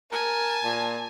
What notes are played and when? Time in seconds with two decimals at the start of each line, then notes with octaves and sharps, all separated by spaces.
0.12 A#4 G#5 A5
0.64 A#2